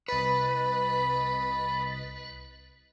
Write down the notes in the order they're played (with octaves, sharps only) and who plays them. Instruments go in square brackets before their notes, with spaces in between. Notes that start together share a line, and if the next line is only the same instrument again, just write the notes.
[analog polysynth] C2 D#5 A6 [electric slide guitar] B4 [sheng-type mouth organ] B5